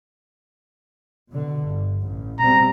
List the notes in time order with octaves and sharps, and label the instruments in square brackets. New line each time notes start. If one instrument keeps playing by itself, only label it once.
[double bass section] B2 D3
G1
A1
[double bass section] B2 G3 C4 [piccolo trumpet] A#5